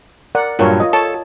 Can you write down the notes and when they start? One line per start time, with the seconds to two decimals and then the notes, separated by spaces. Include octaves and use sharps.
0.35 A#4 D5 F#5
0.59 G2 A#2 F#3 F4 A#4 C#5
0.80 F4 D#5
0.93 A4 C#5 A5